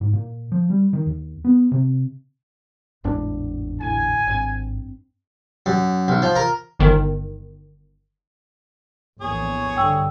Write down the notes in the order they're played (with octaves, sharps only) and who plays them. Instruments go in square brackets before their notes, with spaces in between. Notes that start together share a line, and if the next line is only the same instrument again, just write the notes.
[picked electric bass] G#2
A#2
F3
G3
D#3
D#2
B3
C3
[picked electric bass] G#1 E2 D4 [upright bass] A2 G#3
[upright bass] D2 A2 [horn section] G#5
[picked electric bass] G#1 [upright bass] G2 C4
[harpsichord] F#2
B1
F3
A#4
[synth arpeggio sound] G1 D#3
[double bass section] A#1 E2 A2 [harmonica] G#4 C#5
[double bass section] G2 D3 [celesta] G5 E6